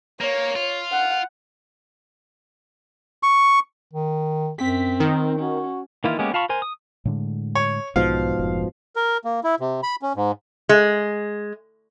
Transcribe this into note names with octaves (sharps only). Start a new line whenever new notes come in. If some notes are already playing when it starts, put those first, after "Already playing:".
A#3 C#5
F4
F#5
C#6
D#3
F#2 C4 B6
D#3
C#4 F#4
D#3 E3 A#3 E4 F4
G#3 A#3 B3 C#4 G4
F4 F5 A5 B5 C#6
A#4 C5 G#5
D#6
A2 D3 G#3
C#5
B1 G#2 B2 F3 F5
F1
A#4
A#3
E4
C3
B5
C#4
G#2
G#3